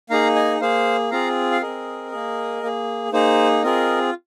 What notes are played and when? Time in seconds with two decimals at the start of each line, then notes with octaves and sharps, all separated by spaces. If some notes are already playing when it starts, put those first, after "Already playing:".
0.10 A#3 D#4 G#4 F5 A#5
0.35 D#5 G#5
0.60 A#3 G#4 C5 F5
1.11 C4 F4 G#4 F5 A#5
1.51 F5
1.61 C4 G#4 A#4 D#5
2.12 A#3 G#4
2.63 A#3 G#4
3.12 A#3 D#4 G#4 C5
3.63 C4 F4 G#4 A#4 D#5